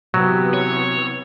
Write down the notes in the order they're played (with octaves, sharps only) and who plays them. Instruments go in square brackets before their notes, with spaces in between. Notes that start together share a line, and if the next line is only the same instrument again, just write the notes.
[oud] C3 [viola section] E3 B3 [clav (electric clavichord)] F#3
[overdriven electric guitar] C#5